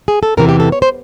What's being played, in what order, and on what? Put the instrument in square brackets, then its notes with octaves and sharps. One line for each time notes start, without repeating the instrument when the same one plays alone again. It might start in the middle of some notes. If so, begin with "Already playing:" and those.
[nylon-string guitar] G#4
A4
E2 C3 E3 A#4
G4
A4
C#5
C5